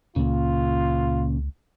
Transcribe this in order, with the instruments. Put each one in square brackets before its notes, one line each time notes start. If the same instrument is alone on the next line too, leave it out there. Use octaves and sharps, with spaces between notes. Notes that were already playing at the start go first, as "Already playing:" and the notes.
[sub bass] C#2 [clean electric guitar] A#2 C#3 [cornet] F4